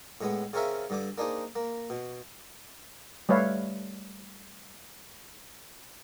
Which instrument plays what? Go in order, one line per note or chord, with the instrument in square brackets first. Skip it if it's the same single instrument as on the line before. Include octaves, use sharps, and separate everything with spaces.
[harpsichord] A2 G#3 B3
C#3 C4 C#4 A#4 E5 F5
G2 D3 D6
A#3 D4 D#4 G#4 C5
A#3
B2
[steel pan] G3 A3 B4 C#5 E5 F5